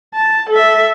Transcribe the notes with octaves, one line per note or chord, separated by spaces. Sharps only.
A5
A4 E5